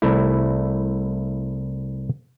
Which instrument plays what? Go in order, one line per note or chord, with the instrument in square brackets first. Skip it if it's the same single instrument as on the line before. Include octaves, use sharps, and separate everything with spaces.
[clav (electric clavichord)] C2 A3 E4